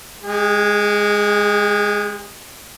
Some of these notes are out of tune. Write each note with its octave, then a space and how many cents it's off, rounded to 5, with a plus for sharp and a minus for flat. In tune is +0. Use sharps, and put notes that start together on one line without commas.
G#3 -5 G4 +45